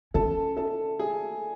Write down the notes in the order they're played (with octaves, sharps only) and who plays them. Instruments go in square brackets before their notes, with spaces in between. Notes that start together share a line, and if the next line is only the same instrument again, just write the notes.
[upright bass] C#4 [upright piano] A4 A5
[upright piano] A4 A5
G#4 G#5